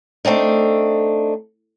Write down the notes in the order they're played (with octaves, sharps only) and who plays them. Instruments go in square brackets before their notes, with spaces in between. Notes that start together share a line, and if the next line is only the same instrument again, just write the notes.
[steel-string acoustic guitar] A3 C4 D4 D#4